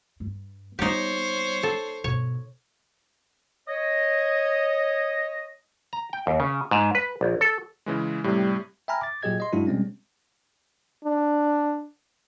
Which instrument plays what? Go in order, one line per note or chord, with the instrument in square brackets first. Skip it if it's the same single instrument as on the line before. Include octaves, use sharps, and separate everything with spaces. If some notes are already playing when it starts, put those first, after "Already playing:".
[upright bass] G2
[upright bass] G3 B3 [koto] D#4 G4 [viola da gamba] C5 C#5
[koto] A4
[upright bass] G2 B2 [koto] C#5
[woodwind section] C#5 D#5
[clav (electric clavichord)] A#5
G5
D#2
C#3
G#2
B4
A#1
A4
[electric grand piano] C#3 E3 G#3
[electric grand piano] A2 C3 [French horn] G3
[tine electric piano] E5 G5 G#5 A#5 B5 F6
D6 A6
A#2 F#3 G4 G#4 D#5 G#6
D#5 C6
G2 F#3 G#3 D4 E4 F#4
B2 G3 G#3 C4 C#4
[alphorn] D4